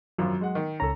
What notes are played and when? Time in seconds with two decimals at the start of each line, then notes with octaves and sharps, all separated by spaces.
0.18 G#1 F#2 F3 F#3
0.41 G#3 F#5
0.55 D#3
0.80 C#2 C#4 A4 A#5